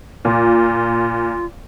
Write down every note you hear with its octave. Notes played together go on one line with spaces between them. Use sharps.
A#2 F4